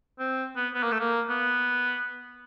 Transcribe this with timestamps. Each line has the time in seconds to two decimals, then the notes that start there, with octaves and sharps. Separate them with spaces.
0.19 C4
0.56 B3
0.74 B3
0.83 A#3
0.92 A3
1.00 A#3
1.29 B3